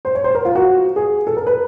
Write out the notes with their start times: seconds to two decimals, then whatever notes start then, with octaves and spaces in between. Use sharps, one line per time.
0.05 C5
0.15 C#5
0.24 C5
0.35 A#4
0.45 F4
0.55 F#4
0.96 G#4
1.27 A4
1.37 A#4
1.47 B4